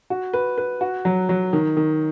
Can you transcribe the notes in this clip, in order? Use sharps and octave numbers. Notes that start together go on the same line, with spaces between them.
F#4
B4
B4
F#4
F#3
F#3
D#3
D#3